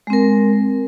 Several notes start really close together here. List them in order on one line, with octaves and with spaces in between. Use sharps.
G#3 C4 A#4